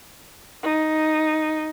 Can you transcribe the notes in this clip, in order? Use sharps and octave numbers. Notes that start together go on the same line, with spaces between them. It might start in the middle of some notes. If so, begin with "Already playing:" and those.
D#4